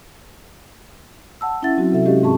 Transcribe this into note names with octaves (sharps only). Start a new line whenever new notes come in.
F#5 A5 E6
C#4 E4 E5 F#5 A6
F#3 C4 F#4
C3 A4 E5
G#3 C#4 F#4 G4 D#5 F5
G#2 C4 G#4 A5 C#6